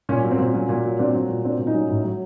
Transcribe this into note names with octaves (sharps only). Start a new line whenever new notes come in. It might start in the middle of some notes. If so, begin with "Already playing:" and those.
A#2 C#4
F#3
C4
A#2
F#3 C#4
A#2
F#3
A#2 C4 D4
F#3
A#2
F#3 C4 D4
A#2
C#4 D#4
F#3
A2
F#3